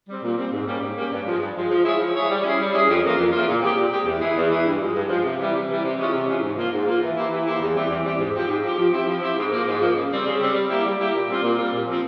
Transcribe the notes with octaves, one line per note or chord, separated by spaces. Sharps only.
G3 C4
A#2
G3 C4
G#2
G3 A#3 C#4 G4
G#2
G3 A#3 C#4 G4
G2
F3 G#3
G2
F3 G#3
F3
G#3 E4 G#4 C#5
F3
G#3 E4 G#4 C#5
G3
C#4 E4 G#4
G3
C#4 E4 G#4
F2
C#3 E3 A#3 F4
F2
C#3 E3 A#3 F4
A#2
G#3 C4 G4
A#2
G#3 C4 G4
E2
E3 G#3 E4 G#4
E2
E3 G#3 E4 G#4
G2
F3 G#3
G2
F3 G#3
C3
E3 G3
C3
E3 G3
C3
E3 G#3 C#4 F4
C3
E3 G#3 C#4 F4
G#2
F3 A#3 F4
G#2
F3 A#3 F4
E3
A#3 E4 G4 C5
E3
A#3 E4 G4 C5
E2
E3 G3 C4 G4
E2
E3 G3 C4 G4
G#2
F3 C4 G4
G#2
F3 C4 G4
F3
C4 E4 G4
F3
C4 E4 G4
G#2
F3 A#3
G#2
F3 A#3
C#3
G3 C4
C#3
G3 C4
G3
A#3 E4 G4
G3
A#3 E4 G4
A#2
G3 C4 F4
A#2
G3 C4 F4
A#2
F3 C4